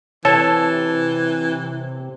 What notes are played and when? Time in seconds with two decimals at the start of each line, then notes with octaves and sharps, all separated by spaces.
0.25 C3 E3 A4 C#5 A5